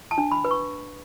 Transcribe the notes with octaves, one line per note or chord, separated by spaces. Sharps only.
A5
D4
B5
B4
C#6